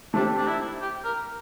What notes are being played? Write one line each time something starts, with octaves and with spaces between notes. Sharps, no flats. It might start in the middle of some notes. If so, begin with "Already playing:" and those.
A3 C4 D4 G4
D4
E4
G4
A#4